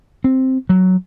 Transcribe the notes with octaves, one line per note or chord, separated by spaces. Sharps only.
C4
F#3